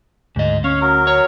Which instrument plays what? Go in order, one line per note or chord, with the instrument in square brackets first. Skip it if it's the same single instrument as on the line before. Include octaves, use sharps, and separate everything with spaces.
[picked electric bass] D2 [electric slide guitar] G#2 D#5
[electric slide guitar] C#4 [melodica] C#5 F5
[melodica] F#3 A#4
[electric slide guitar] C#5